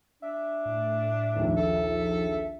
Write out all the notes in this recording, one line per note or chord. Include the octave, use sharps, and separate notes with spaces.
D4 E5
A2
A#1 D#2
F3 A4